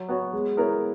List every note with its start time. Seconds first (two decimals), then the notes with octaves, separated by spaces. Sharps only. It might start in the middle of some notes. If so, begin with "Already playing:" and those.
Already playing: F#3
0.09 B3 F#4 C#5
0.33 G#3
0.57 B3 E4 A#4 C#5